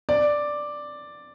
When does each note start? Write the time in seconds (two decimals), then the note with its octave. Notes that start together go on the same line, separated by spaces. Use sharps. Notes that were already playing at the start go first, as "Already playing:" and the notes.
0.09 D5